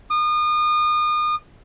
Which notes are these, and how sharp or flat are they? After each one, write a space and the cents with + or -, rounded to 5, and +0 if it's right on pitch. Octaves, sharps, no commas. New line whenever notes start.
D#6 -35